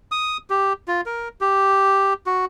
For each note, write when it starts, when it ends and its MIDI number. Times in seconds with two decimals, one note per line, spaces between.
0.11 0.37 87
0.50 0.73 67
0.88 1.01 65
1.06 1.28 70
1.41 2.13 67
2.26 2.45 66